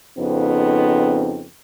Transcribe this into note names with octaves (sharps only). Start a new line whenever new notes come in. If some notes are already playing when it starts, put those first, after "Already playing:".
F2 C#3 B3 C4 D#4